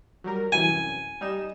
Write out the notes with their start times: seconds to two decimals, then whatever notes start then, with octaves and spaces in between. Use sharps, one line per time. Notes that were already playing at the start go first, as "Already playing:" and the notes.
0.24 F#3 G3 A#4
0.52 C2 F#2 E3 G#5
1.21 G3 D#4 E7